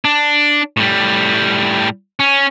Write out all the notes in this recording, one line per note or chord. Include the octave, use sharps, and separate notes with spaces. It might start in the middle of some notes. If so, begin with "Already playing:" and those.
D4
A2 G3
C#4